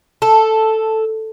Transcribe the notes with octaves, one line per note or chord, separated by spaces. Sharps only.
A4